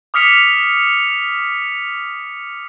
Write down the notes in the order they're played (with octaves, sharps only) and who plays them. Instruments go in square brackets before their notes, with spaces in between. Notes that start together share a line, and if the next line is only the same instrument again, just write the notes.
[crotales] D6 D#6 F6 B6 C#7 F7